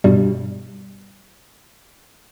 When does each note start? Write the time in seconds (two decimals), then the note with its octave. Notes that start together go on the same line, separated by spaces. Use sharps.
0.04 G2 B2 G3